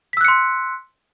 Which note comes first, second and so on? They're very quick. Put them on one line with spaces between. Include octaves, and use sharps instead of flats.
B6 E6 F#6 C#7 C6